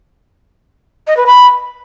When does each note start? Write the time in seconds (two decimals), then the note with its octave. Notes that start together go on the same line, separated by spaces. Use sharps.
1.07 D#5
1.17 B4
1.26 B5